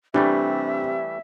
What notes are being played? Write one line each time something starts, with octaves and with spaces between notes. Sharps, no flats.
C3 E3 G3 A3 D4 E5